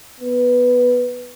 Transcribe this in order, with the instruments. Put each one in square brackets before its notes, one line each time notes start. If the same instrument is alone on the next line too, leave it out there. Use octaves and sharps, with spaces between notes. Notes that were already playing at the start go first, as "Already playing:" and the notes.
[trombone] B3